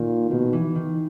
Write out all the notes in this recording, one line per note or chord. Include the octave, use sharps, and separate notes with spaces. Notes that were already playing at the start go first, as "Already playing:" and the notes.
Already playing: A#2 D#3
B2 D#3
E3
D#3